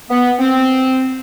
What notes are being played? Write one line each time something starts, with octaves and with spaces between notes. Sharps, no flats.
B3
C4